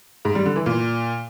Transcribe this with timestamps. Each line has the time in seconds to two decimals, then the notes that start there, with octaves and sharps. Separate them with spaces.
0.25 G#2
0.35 G3
0.45 D3
0.56 E3
0.66 A#2